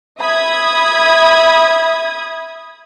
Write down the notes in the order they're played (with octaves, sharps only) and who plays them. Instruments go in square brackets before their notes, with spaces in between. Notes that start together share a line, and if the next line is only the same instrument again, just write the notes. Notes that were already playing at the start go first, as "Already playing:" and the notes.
[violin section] E5 B5 D#6 G#6